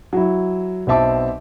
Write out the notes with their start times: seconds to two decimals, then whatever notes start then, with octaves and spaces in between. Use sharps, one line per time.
0.13 F#3 E4
0.87 B1 B2 C4 E5 A5 D6